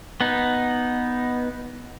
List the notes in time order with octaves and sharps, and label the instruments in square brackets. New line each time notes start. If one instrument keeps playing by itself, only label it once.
[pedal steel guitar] B3 D#4